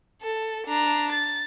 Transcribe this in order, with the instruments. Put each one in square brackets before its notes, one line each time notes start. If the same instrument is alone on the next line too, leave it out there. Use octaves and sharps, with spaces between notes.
[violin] A4
D4 A#5
A6